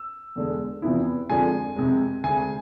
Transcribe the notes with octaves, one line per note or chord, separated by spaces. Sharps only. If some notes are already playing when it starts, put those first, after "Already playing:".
Already playing: E6
E2 D3 G#3
E2 C3 F3 B3 E4
F2 D3 F3 G#3 G#5
F2 C3 G#3
D2 C3 G#3 G#5